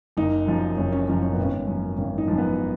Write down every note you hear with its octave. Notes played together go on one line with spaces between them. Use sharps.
F#1 D#4
F#2 F3
F#1 C#4
C#4
F#2 F3 C#4
C#4
G#1 B3
C#4
F#2 F3
G#1 C#4
D#4
F#2 F3
B3